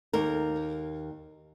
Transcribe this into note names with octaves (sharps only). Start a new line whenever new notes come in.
D#2 A#4